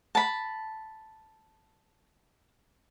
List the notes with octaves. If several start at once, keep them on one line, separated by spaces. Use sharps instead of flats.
A5 B5